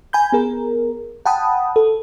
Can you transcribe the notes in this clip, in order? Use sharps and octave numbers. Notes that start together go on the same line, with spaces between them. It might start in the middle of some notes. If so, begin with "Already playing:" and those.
G#5 B5 G6
B3 G#4 A#4
F#5 G5 A5 B5 D#6
A4